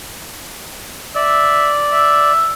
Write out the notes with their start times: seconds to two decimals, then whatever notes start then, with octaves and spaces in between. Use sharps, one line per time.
1.15 D5 E5
1.91 E5